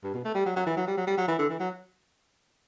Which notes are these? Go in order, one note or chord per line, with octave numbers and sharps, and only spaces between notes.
G2
B2
A3
G3
F#3
F#3
E3
F#3
G3
F#3
G3
F#3
E3
D3
E3
F#3